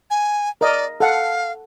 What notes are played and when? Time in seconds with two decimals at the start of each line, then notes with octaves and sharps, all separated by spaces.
0.10 G#5
0.61 A#4 D5 D#5
1.00 A4 F5 F#5